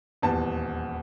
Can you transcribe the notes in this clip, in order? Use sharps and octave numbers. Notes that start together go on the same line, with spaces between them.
D#1 E2 A5